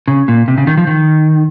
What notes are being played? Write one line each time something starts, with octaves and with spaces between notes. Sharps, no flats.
C#3
A#2
C3
C#3
D#3
F3
D#3